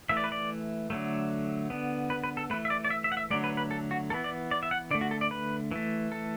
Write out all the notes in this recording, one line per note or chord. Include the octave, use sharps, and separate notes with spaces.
E3 A3 E5
D5
B4
D5
D3 F#3 A3
D3 B3
B4
B4
A4
E3 A3 B4
E5
D5
D5
E5
E5
F#5
E5
D3 F#3 A3 D5
B4
B4
A4
F#4
E3 B3 A4
D5
D5
E5
F#5
D3 A3 D5
F#4
A4
D5
B4
E3 A3
A4